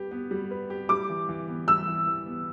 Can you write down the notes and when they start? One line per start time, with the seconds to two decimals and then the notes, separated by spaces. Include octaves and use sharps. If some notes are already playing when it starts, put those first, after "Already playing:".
Already playing: G3 G4 B4
0.11 B3
0.31 G3
0.51 B4
0.70 G4
0.89 G3 D6
1.10 E3
1.29 E3
1.48 B3
1.68 G3 E6
1.88 E3
2.07 E3
2.26 B3